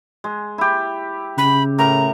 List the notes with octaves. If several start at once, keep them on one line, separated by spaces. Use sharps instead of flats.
G#3
E4 G4
C#3 B5
A2 A#4 A#5